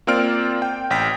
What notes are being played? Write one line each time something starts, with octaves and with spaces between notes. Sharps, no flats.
A#3 C4 F4 D5 F6 D7
G5
A1 G5 B6